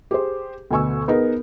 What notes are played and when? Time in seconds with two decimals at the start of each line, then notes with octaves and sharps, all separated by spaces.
0.11 G4 G#4 C5
0.71 D2 B2 G#5 C#6 E6
1.08 B3 D#4 G#4 A#4 B4